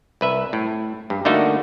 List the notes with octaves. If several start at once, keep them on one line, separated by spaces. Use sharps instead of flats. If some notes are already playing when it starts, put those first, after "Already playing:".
C2 B4 E5
A2
G2
D3 A3 A#3 D#4 F#4